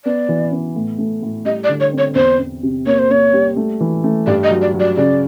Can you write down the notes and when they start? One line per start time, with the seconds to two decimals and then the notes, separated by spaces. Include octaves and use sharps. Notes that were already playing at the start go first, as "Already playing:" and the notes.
0.05 B3 D5
0.29 E3
0.52 B3
0.76 A2
0.98 A3
1.23 A2
1.45 G3 D#5
1.64 D5
1.69 D3
1.80 C#5
1.92 C4
1.98 C#5
2.15 E2 C5
2.39 E2
2.63 C3
2.86 A#3 C#5
2.99 C5
3.10 A#3 C#5
3.33 G3
3.56 A3
3.80 E3
4.04 A3
4.26 G2 D5
4.44 D#5
4.51 F#3
4.62 D5
4.74 F#3
4.80 D5
4.96 C#3 D5